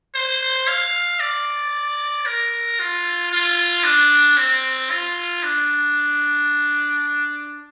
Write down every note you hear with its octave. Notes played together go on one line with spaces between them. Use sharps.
C5
F5
D5
A#4
F4
F4
D4
C4
F4
D4